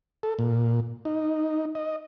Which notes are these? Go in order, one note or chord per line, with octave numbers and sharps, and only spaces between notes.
A4
A#2
D#4
D#5